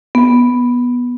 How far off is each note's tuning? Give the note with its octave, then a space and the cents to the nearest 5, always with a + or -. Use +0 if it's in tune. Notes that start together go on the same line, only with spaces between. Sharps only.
B3 -10